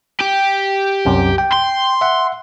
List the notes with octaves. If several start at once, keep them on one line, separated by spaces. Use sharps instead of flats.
G4
C2 F#2 C3
G5
C6
E5 F#5